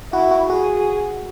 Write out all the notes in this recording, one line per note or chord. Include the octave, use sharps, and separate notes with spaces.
E4 F#4
F#4
F#4 G#4